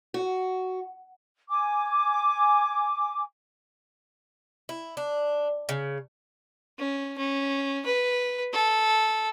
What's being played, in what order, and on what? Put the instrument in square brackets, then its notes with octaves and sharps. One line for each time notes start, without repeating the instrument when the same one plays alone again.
[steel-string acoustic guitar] F#4
[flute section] G#5 D6
[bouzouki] E4
D4
C#3
[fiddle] C#4
C#4
B4
A4